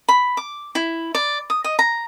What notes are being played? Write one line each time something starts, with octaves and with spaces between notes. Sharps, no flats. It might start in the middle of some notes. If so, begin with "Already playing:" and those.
B5
D6
E4
D5
D#6
D#5
A#5